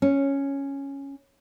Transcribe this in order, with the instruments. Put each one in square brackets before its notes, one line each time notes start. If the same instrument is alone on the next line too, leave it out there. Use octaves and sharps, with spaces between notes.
[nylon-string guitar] C#4